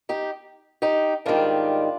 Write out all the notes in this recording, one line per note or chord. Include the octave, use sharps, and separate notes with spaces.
D#4 G4
D#4 G4
G#2 D#3 G3 D4 F4